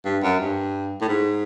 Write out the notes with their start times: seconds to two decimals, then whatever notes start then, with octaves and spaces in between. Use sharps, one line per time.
0.05 G2
0.23 F#2
0.39 G2
1.01 A2
1.08 G#2